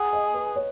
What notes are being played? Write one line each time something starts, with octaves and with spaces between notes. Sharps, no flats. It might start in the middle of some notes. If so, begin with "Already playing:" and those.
Already playing: G#4 F#5
D#5
B4
C#5